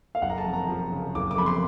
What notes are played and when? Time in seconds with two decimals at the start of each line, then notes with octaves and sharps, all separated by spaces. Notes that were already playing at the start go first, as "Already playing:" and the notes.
0.15 F5
0.22 F#1 F#5
0.29 A#5
0.38 A5
0.46 F2
0.53 A#5
0.68 F3
0.92 C#3
1.15 F#1 D6
1.31 D6
1.38 F2 B5
1.46 C6